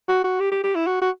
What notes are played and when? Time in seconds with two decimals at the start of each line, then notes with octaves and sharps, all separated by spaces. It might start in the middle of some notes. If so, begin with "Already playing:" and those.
0.08 F#4
0.24 F#4
0.40 G4
0.51 G4
0.63 G4
0.75 E4
0.87 F#4
1.01 F#4